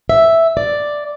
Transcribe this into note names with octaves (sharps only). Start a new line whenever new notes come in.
E5
D5